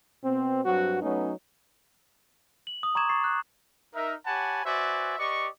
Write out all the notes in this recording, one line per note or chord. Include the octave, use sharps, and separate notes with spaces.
B2 C4
G2 F#3 C4 F#4
F#3 A3 B3 C#4 D#4
F#7
D#6
A#5 C#6 D6 G#6 E7
C#6 A6 C7
F#6
D#4 A#4 E5
G4 C#5 F#5 G#5 A5 B5
F#4 B4 C5 D5 E5 G#5
G4 B4 D5 D#5 C#6